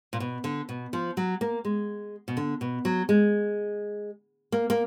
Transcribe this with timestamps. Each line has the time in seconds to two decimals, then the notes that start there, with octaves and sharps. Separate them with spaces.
0.13 A#2
0.20 B2
0.44 D3
0.69 B2
0.93 F3
1.17 F#3
1.41 A#3
1.65 G#3
2.28 B2
2.37 D3
2.61 B2
2.85 F#3
3.09 G#3
4.52 A#3
4.70 A#3